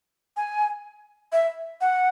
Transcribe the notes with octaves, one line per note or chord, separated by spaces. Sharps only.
G#5
E5
F#5